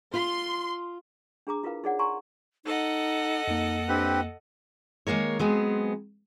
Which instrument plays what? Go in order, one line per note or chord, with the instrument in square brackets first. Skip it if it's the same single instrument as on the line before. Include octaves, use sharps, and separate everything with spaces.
[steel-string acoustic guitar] F4 [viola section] C6
[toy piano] D4 G#4 A#5 D6
E4 F4 A#4 B4 F5
D#4 E4 G#4 C#5 D5 F#5
D5 G#5 A#5 C6 C#6
[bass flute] D#4 [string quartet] A4 D#5 F#5
[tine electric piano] F2 A#3 [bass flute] D#4
[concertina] C4 G4 B4 [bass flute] D4
[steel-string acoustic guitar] D#3 G#3 A#3 A#4 C#5
F#3 G#3 B3 C4